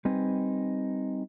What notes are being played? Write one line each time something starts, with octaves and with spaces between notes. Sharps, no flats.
G3 C4 D#4 B4 G#5